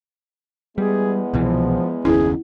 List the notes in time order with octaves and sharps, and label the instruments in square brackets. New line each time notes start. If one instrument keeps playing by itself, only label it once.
[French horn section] E2 G#3 B3 [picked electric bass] G3 [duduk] G#4
[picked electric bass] C2 B2 E3 [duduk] F3
[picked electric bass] F#1 D#2 C#4 [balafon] E4 [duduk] G#4